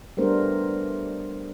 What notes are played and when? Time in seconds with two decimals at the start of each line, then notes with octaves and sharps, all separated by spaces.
0.17 G3 A3 B3 D4 A#4 C5